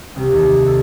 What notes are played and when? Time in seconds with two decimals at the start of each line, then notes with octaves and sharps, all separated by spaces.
0.16 C2
0.32 D#2
0.67 A4